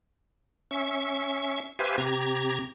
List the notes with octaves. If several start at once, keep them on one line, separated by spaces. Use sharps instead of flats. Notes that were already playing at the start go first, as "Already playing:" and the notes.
C#4 E5 C#6
G4 B4 C5 E5 F5 G#5
C3 G4 A#5 G#6